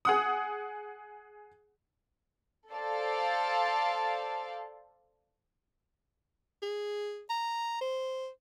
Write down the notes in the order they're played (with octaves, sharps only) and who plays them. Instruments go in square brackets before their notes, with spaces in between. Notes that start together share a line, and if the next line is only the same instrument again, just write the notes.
[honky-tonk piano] G#4 F#5 D#6
[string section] A4 C5 D5 F5 A5
[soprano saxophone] G#4
A#5
C5